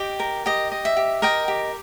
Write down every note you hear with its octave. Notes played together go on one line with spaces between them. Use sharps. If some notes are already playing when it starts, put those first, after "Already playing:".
Already playing: G4 D#5 G5
A#4
G4 D#5
D#5
E5
G4
A#4 D#5 G5
G4